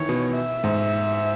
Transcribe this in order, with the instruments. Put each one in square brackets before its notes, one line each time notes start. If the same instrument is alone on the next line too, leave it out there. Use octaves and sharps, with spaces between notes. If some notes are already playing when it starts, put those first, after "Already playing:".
Already playing: [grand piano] D#3 E3 [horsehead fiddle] C#5
[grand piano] B2
[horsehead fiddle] E5
[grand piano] G#2